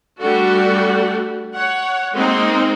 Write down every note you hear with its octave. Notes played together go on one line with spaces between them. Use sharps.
G3 A3 D4 F#4 A4
C#5 F#5
G#3 A#3 C4 D#4